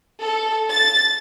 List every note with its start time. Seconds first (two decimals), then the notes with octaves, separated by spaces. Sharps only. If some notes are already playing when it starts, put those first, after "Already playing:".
0.22 A4
0.69 A6